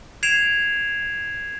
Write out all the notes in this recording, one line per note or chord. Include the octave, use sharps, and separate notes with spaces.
G#6 C7 D7 E7 F7